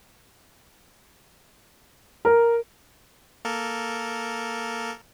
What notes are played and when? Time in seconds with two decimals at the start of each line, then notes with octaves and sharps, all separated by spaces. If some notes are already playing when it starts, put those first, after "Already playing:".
2.25 A#4
3.45 A#3 A4 A#4